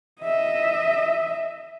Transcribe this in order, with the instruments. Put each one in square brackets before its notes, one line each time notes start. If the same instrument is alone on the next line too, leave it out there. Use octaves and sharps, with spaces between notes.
[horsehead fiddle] D#5 E5